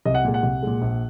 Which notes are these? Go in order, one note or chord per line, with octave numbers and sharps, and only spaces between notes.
C2 D#5
F#5
A#2 G#3
F#5
C2
A#2 G#3
A#1